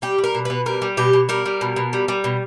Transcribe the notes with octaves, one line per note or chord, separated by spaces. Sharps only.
G3 G4
G3
A#4
B2
B2 B4
G3 A#4
G3
B2 G4
B2
G3 A#4
G3
B2
B2
G3
G3
B2